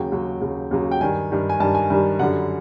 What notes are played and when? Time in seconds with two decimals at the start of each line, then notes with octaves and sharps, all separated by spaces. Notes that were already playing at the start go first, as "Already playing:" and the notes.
Already playing: D#2 C#3 F#3 G5
0.12 D#2 C#3 F#3
0.41 D#2 C#3 F#3
0.71 D#2 C#3 F#3
0.91 G5
1.01 G2 D#3 G3 G#5
1.31 G2 D#3 G3
1.50 G#5
1.60 G2 D#3 G3 A5
1.75 G#5
1.90 G2 D#3 G3
2.19 F#2 D3 G3 F#5